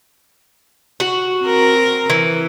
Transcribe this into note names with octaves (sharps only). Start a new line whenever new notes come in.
F#4
C4 A#4
E3